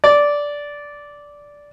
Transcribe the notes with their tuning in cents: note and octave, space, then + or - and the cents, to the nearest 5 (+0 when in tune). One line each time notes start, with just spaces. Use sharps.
D5 -10